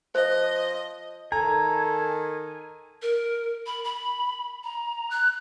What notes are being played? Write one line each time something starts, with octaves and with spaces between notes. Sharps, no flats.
F3 C5 D#5
D#3 A4 G#5 A#5
A#4
B5
B5
A#5
F#6